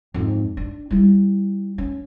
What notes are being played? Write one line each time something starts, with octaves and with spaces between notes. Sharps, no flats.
F2 G#2
D4
G3 E4
C#4